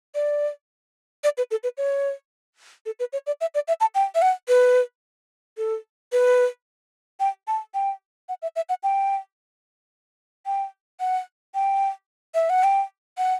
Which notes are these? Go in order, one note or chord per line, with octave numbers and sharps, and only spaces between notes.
D5
D5
B4
A4
B4
C#5
A4
B4
C#5
D5
E5
D5
E5
A5
G5
E5
F#5
B4
A4
B4
G5
A5
G5
F#5
E5
E5
F#5
G5
G5
F#5
G5
E5
F#5
G5
F#5